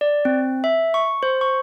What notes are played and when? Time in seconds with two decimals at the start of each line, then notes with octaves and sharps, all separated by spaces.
0.01 D5
0.25 C4
0.64 E5
0.94 C#6
1.23 C5
1.41 C#6